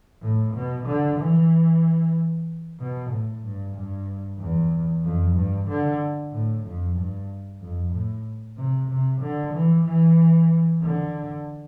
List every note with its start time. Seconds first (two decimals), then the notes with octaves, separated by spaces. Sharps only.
0.22 A2
0.55 B2
0.86 D3
1.18 E3
2.79 B2
3.11 A2
3.43 G2
3.75 G2
4.39 E2
5.03 F2
5.36 G2
5.68 D3
6.32 A2
6.64 F2
6.97 G2
7.61 F2
7.93 A2
8.57 C3
8.90 C3
9.21 D3
9.54 E3
9.85 E3
10.82 D3